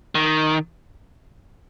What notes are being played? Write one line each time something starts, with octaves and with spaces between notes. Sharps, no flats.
D#3